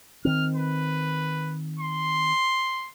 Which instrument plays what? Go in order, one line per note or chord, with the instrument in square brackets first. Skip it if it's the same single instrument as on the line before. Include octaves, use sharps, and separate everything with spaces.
[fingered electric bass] D#3 C4 [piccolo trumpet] F6
[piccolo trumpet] B4
C6